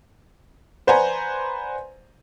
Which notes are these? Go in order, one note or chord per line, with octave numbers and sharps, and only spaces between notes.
B4 C5 D5 F#5 G#5 A#5